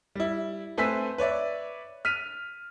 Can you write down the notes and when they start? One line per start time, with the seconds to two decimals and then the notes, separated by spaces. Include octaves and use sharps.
0.15 G3 E4
0.77 A3 C4 B4 G#5 E6 B6
1.18 B4 C#5 D5 E5
2.05 F6 B6 D#7 F7